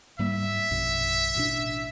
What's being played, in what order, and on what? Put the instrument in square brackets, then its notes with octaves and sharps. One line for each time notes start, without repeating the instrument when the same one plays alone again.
[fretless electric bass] G#2 G3 A#3 [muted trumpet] E5
[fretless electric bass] A#1 F#2 B2
A1 B2 D4